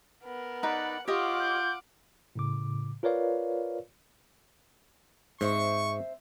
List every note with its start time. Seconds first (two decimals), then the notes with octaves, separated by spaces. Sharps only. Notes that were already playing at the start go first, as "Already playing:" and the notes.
0.24 B3 A#4
0.63 D#4 B4 D5 F#5
1.08 F4 G4 C#5 D#5 F#5 D6
1.40 G6
2.35 A2 C#3 D6
3.03 F4 A#4 B4 C#5 D5 F5
5.41 G#2 C4 C5 E5 C#6